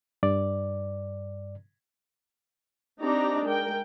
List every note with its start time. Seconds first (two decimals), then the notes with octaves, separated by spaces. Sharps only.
0.23 G2 D5
3.01 C4 D4 D#4 G4 D5 A#5
3.46 G#3 A#4 G5